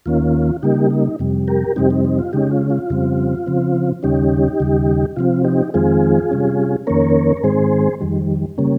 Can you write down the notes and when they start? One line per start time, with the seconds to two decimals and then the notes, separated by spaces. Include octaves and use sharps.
0.06 D#2 D#3 A#3 C#4 F4
0.62 C#3 G3 A#3 D#4 G4
0.90 D#4
1.19 F2 C3 G3
1.48 G4 A#4
1.76 F2 C3 G3 C4 D#4 G4
1.90 D#4
2.05 D#4
2.19 F4
2.33 C#3 G#3 C#4 D#4 G4
2.51 F4
2.70 F4
2.90 F2 C#3 G3 C4
3.47 C#3 F3 C4
4.03 D#2 C#3 G3 C#4 D#4 G4
4.60 D#2 C#3 G3
5.16 C3 F3 C4 F4
5.45 D#4 G4
5.74 F2 D#3 G#3 C4 F4 G#4
6.31 C3 G3 C#4
6.87 F2 D#3 A#3 C#4 A#4 C#5
7.37 A#4
7.43 G#2 D#3 G#3 C4 G#4 C5
8.00 F2 D#3 G3
8.58 C#3 G3 A#3 C#4